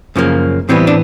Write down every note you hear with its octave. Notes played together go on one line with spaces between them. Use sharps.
F#2 C#3 F3 A#3
A2 E3 G3 B3 C4
D4